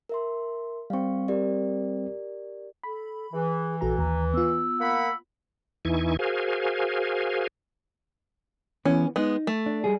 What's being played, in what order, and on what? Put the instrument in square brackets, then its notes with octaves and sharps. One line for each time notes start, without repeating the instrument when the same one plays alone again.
[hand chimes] A#4 E5 C6
[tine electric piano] G3 C4 [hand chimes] F5 C#6
[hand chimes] G4 A#4 D5
[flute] A4 [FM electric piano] B5
[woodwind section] E3 [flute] G#4
[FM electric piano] A#1 F#4 A#5 [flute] A4
[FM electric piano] D#2 [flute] A#5
[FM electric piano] B3 F4 [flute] E6
[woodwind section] A#3 F#5 B5
[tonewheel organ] E2 E3 D#4 E4 G#5 C#6
F#4 G#4 A#4 C5 F5 G#5
[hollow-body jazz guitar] E3 B3 [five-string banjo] C#4
[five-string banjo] G#3 B3 [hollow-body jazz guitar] D#4
[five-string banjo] A3
[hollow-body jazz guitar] D4
G3 G#4